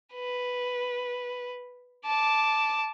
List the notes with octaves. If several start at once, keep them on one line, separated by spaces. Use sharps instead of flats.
B4
A5 D6